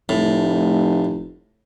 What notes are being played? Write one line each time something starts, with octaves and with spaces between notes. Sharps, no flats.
F1 A2